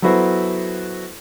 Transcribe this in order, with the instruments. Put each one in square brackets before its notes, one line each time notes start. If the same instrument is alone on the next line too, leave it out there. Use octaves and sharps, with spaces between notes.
[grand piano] F#3 B3 E4 F#4 A4 C5